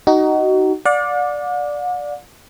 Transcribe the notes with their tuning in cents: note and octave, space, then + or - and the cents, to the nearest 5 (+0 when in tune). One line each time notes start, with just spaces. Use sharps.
D#4 +0 F#4 +30
D5 +0 F#5 -45